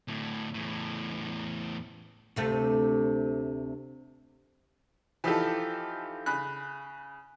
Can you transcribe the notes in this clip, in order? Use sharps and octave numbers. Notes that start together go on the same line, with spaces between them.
D2 A2
E2 A2
D2 C3 A3
E3 F3 D#4 F4 G4 A4
C#3 B5 F#6